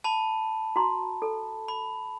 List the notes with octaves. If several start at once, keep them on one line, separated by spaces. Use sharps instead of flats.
A5 B5
F#4 A#5 C6
A4
B5